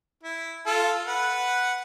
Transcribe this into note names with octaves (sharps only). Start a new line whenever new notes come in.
E4
F4 A4
B4 F#5